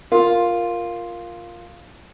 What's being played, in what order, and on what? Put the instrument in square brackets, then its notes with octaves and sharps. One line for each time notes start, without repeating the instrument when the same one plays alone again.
[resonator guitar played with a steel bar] F4 [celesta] A#4